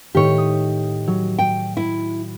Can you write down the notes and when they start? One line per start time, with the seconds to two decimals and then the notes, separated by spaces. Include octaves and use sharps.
0.15 A2 D#3 G4 C#5
0.38 D#6
1.07 F#3
1.39 G5
1.77 E4